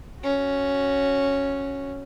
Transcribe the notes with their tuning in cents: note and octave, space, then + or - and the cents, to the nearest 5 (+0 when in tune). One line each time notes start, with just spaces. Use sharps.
C#4 +0 F#4 +0